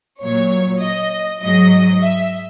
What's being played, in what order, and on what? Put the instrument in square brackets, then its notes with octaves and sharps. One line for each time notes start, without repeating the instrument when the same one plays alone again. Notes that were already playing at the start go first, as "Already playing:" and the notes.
[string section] A#2 F#3 C#5
D#5
G#2 F#3 D#5
E5